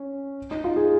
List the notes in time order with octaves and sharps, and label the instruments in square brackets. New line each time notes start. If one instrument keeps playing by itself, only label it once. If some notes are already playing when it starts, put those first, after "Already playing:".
Already playing: [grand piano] C#4
D#4
F4
G#4